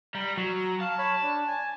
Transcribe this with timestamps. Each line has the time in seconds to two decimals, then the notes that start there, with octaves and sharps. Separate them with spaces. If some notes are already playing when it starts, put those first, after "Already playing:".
0.15 G3 A#5
0.38 F#3
0.81 F5 A5
0.98 C#5 B5
1.23 D4
1.48 G#5